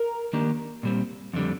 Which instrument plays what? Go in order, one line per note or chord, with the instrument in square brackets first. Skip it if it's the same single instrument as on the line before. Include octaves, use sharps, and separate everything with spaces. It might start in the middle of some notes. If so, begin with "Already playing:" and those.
Already playing: [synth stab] A#4
[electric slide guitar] D#3 A#3 D4 G4
A#2 G3 C4
F2 D3 G3